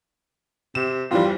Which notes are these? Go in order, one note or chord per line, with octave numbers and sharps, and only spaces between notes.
C3 E7
F2 E3 G3 F4